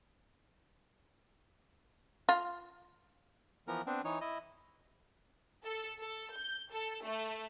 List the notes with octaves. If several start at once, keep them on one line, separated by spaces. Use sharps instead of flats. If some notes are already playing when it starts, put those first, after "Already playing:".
F4
E3 F3 B3 A#4
B3 C4 D4
E3 D#4 C#5
E4 D#5
A4
A4
G6
A4
A3